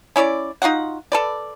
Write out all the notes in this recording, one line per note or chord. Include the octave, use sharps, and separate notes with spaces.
C#4 E4 C#5 D5
D#4 F4 F#4 F#5
A4 B4 D5